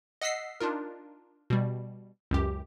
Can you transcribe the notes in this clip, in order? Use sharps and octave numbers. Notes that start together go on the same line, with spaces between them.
D#5 F#5 E6 B6 C7
D4 D#4 F4 A#4
B2 G3
C#2 F#2 G4